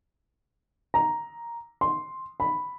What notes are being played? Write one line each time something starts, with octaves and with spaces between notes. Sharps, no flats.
A#5
C6
B5